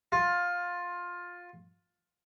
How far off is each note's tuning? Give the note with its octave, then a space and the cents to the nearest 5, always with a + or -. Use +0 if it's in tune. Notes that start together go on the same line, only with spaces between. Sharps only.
F4 +15